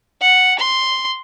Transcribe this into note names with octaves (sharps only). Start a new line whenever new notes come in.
F#5
C6